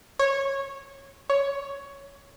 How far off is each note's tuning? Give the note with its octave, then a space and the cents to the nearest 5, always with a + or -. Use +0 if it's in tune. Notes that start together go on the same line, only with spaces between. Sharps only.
C#5 -15
C#5 +10